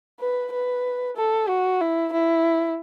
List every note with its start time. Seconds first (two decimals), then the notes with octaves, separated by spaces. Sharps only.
0.20 B4
0.53 B4
1.17 A4
1.49 F#4
1.81 E4
2.13 E4